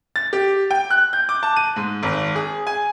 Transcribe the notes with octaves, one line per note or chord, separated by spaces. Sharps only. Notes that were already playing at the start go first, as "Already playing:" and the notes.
A6
G4
G5
F#6
G6
D6
A5
D#7
G#2
G#1
G#4
G#5